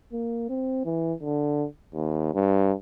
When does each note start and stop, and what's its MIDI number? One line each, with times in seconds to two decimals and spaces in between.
0.13 0.48 58
0.50 0.82 60
0.85 1.13 52
1.22 1.66 50
1.95 2.34 39
2.34 2.73 43